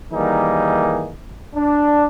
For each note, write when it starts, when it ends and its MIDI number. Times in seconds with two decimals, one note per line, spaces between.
0.13 1.12 51
0.13 1.12 52
0.13 1.12 55
0.13 1.12 58
0.13 1.12 63
0.13 1.12 68
1.55 2.07 62